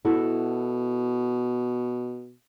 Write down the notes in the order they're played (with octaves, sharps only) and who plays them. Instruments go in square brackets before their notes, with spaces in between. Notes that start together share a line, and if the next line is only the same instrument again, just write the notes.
[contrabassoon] B2 [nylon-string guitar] E4 F#4 A4